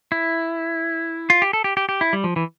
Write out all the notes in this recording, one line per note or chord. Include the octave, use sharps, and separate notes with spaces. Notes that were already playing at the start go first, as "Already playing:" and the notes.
E4
F4
G4
A4
G4
G4
G4
E4
G3
F3
E3